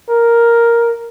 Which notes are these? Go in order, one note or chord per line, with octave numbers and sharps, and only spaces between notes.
A#4